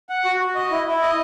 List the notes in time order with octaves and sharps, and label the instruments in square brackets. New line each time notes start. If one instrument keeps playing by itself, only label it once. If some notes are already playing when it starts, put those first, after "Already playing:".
[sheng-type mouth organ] F#5
F#4
F#4
D#5
E4
E4
D#5